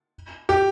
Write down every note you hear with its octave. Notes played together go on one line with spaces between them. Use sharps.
G4